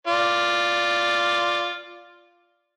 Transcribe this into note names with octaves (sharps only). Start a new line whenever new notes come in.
F4 D5